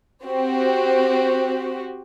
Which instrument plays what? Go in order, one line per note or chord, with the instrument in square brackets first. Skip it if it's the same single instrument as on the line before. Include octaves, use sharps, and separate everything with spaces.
[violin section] C4 F#4 G4